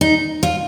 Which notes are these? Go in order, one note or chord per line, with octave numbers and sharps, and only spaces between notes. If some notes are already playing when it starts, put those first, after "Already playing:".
D#4
F4